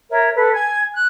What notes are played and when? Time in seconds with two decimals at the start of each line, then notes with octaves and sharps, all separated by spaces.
0.09 A#4 C#5 E5
0.35 A4 B4
0.51 G#5 G#6
0.92 F#6